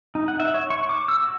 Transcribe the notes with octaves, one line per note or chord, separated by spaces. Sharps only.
D#4
F#5
E5
C#5
C#6
D6
E6
F#4